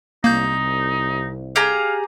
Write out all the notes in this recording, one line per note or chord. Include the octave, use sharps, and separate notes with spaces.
C2 A#3 D#4 G6
G4 G#4 F5 A#5